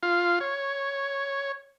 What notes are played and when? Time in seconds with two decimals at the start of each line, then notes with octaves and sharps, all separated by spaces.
0.03 F4 F5
0.40 C#5